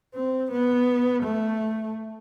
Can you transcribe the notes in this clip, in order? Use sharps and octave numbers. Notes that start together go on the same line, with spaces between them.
C4
B3
A3